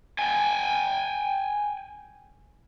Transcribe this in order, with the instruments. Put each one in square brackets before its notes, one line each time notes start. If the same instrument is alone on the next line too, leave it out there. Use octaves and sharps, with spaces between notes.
[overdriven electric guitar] G5 G#5